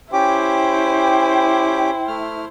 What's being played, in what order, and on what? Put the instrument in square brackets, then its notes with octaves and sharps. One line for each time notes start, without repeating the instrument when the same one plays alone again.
[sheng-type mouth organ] C#4 G4 D6 [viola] E4 C5 [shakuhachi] G5
[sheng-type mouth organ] A3 F6